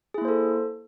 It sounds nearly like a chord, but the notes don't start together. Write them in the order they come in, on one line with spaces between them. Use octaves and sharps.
G#4 E4 A#3 C5 A4